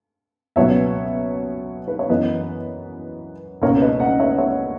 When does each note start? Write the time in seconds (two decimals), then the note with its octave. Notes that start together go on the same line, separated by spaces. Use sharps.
0.56 C#2 B2 F#3 B3 C#5 E5
1.88 B4
1.99 C#5
2.09 F#2 E3 B3 B4 D#5
3.62 C#2 B2 A#3 A#4 C#5
3.82 B4 D#5
4.00 D#5 F#5
4.19 C#5 E5
4.38 C#5 E5